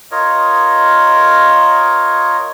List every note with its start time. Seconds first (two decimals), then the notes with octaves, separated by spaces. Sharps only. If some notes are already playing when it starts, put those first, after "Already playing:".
0.12 F4 A#4 C#5 D#5